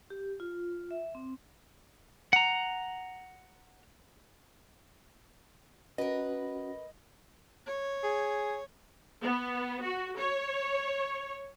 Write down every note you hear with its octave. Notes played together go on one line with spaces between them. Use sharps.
G4
F4
E5
C4
F#5 A#5
C#4 F#4 A#4 B4 D#5 F#5
C#5
G#4
B3
F#4
C#5